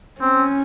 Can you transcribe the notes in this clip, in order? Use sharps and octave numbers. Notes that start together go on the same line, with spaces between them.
C4 C#4